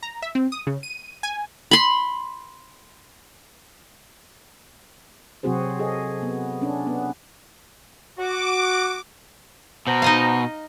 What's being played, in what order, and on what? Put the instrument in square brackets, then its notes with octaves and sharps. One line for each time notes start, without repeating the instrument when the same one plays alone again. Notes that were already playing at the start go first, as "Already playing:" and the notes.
[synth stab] A#5
E5
C4
D#6
C#3
D#7
G#5
[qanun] B5 C6
[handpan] C3 F#3 C4 F#4 G#4 C5
G#4 A4 D#5
B3
C#4 D4
B3
[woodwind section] F#4 [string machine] D6
[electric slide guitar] B2 [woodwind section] C5 F#5 A#5
[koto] D#4 D#5 F5